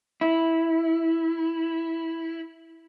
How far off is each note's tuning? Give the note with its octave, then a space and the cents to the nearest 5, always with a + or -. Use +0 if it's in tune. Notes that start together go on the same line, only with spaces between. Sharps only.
E4 -5